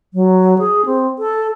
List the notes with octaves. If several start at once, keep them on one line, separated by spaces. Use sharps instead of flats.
F#3
G#4
C4
A4